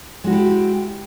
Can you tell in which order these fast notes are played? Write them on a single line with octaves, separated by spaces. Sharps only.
G#3 F#4 E4 G4